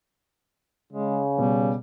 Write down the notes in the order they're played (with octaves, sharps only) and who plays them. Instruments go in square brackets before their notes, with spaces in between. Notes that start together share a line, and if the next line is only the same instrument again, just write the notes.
[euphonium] C#3 [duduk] G#3
[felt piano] B2 [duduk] G3